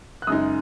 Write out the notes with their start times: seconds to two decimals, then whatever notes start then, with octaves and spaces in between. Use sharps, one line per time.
0.22 F#6
0.27 F#2 C#3 G#3 D#4 D#6